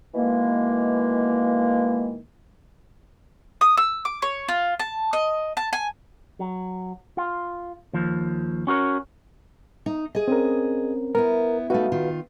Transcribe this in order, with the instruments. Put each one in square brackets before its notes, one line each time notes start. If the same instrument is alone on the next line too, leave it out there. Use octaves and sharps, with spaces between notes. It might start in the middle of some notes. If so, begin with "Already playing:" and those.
[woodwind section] B2 D#3 E3 G#3 A#3
[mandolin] D#6
E6
D6
C#5
F4
A5
D#5
A5
G#5
[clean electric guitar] F#3
F4
D#2 F3
C#4 F#4 A#4 C#5
[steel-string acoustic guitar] D#4
G#4 D#5
[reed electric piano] C4 C#4 A#4
[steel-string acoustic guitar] B3 E4 [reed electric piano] A#4
[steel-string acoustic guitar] A3 D#4 [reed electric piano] F#4 B4 F5
[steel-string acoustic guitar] D#3 F4